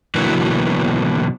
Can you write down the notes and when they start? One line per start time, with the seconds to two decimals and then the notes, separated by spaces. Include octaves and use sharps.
0.15 B2 D3 E3 F#3 A#3 B3